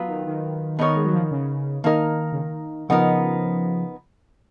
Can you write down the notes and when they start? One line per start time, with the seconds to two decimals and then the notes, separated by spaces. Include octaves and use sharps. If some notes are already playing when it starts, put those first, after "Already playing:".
Already playing: F#3 B3 F4 B4
0.08 D#3
0.27 D#3
0.79 B3 D#4 A#4 C#5
0.95 G#3
1.05 F#3
1.13 F3
1.22 D#3
1.31 C#3
1.84 D#3 A#3 D#4 A#4
2.32 C#3
2.36 D#3
2.89 C#3 F3 B3 D#4 A#4